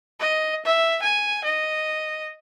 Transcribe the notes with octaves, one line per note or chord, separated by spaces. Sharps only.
D#5
E5
G#5
D#5